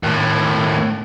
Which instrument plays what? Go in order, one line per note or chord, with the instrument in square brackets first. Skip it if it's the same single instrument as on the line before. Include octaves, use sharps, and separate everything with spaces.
[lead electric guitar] D#2 A2